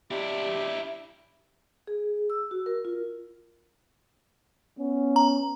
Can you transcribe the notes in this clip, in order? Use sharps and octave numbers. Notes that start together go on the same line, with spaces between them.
D4 E4 G4
G#4
E6
F#4
A#4
F4
B3 C#4
A#5